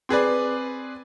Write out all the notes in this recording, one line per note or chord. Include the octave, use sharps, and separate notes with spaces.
C4 G#4 B4 D5